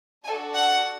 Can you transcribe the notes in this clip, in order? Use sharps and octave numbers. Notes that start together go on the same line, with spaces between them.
D4 F#4 A4 G#5
F#5